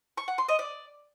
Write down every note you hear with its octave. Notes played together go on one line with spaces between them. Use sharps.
C#6
F#5
C6
D#5
D5